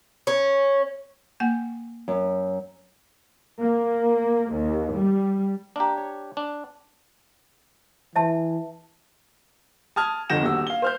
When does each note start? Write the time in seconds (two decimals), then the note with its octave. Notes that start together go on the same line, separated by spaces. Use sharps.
0.27 C#4
1.40 A#3 F#5 G#5
2.08 F#2
3.59 A#3
4.53 D#2
4.97 G3
5.76 A#3 D4 G4 A#5
5.97 C#5
6.37 D4
8.16 E3 E5 A5
9.96 A5 D#6 F6 G#6
10.30 G1 F2 F#5 G6 A#6 E7
10.43 D#1 F#4 E6
10.67 F5 G7
10.82 C5 F6 G6